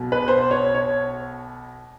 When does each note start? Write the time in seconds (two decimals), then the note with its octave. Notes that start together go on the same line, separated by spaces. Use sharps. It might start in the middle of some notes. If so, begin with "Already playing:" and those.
Already playing: B1 B2
0.12 B4
0.28 C5
0.51 C#5
0.75 C#5